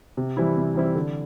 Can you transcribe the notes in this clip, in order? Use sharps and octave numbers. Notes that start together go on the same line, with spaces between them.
C3
E3 G3 C4 E4
C3
E3 G3 C4 E4
D3